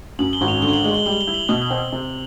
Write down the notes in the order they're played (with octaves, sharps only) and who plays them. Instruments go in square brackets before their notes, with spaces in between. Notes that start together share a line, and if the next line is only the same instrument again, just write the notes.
[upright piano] F#2 [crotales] F#7
[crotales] G7
[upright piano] G#1
[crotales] F7
[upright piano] D3 [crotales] G7
[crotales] F#7
[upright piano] G#3 [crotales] F#7
[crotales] G7
[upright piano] G3 [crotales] F#7
[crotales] G7
[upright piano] E4
[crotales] F#7
[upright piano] B2 [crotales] G7
[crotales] F#7
[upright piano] C4
C3